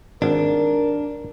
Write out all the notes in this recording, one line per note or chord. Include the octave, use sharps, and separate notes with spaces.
G#1 D4 A#4